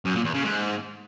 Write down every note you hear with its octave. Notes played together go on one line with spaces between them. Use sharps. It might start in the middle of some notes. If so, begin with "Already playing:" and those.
F#2
A#2
E2
C#3
G#2